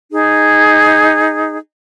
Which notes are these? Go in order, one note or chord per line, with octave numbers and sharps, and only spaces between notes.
D#4 G#4